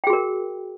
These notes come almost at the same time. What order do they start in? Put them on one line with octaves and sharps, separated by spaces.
G5 G#4 F#4 A#4